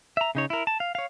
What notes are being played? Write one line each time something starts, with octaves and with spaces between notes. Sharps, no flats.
E5 A#5
C#3 D#4 C#5
E4 A#4
A5
F5
C#5 F5